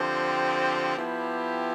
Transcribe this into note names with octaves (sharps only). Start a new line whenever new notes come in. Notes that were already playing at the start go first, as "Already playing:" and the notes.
Already playing: D3 F3 C4 G4
F3 B3 E4 G4